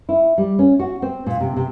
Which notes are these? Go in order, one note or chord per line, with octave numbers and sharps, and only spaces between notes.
E4
G3
C#4
F#4
C4
A#2
C3
C3